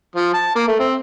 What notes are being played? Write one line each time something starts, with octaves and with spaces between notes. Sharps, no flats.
F3
A5
A#3
A3
C4